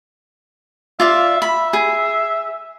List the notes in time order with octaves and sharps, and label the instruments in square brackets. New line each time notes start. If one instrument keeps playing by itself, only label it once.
[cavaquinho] F4 D5 F5 [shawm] E5
[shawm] E5 [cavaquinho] B5
[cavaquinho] G#4